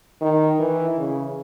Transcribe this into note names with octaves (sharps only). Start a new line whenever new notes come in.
D#3
E3
C#3